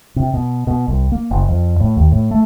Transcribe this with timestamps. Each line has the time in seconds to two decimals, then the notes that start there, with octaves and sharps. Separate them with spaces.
0.16 C3
0.34 B2
0.67 B2
0.88 C2
1.12 A#3
1.31 F#1
1.49 F2
1.80 A2
1.96 D#2
2.12 A2
2.31 A3